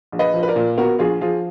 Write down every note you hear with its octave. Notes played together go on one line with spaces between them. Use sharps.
A#1
B4 D#5
F3
B4
A#4 D5
A#2
B3 F#4 A#4
A#1 F4 G#4
F3 F4 G#4